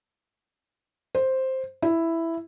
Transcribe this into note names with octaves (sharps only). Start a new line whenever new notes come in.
C5
E4